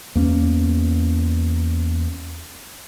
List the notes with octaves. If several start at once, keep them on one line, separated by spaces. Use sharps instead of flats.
E2 A#3 C#4